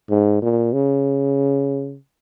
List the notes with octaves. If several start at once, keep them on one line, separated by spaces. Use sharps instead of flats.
G#2
A#2
C#3